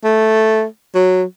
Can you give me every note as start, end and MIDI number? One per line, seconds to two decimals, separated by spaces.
0.04 0.65 57
0.95 1.23 54